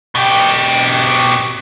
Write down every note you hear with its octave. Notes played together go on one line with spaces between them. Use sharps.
B2 G4